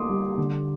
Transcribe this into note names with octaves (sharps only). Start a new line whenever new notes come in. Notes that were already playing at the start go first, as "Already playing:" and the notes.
Already playing: A#3 D#4 C6 D6 D#6
G3
D3